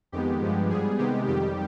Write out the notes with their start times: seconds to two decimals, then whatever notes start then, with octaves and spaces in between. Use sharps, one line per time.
0.12 F2 D#3 G#3 B3 G4
0.41 G2 F3 G#3 B3
0.70 G#2 G3 B3 G#4
0.98 C3 D#3 G#3 B3 G4
1.27 F2 D#3 G3 G4